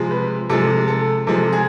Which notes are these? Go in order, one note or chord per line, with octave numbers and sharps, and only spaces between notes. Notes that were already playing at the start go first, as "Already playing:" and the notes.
Already playing: C3 F3 G#3
B4
C3 F3 G#3 A4
A4
C3 F3 G#3 A4
G#4